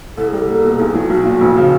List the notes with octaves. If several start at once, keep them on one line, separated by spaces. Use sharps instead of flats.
C2 A4
G#4
G3
A4
A#3
B2
B1 G#4
F#3 F#4
B1 F#4
A#2
F1
C#3